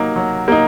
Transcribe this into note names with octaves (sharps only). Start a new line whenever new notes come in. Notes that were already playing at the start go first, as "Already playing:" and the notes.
Already playing: F#3 A#3 D#4
F#3
A#3 D#4